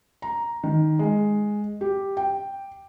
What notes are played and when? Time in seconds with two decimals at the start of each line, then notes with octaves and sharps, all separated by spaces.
0.22 A#5
0.63 D#3
0.99 G#3
1.81 G4
2.17 G5